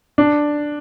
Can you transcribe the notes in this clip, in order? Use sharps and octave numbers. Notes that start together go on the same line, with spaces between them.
D4